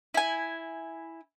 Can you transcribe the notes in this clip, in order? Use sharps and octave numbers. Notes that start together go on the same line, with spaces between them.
E4 G#5